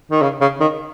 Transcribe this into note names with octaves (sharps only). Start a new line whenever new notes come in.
D#3
C#3
C#3
D#3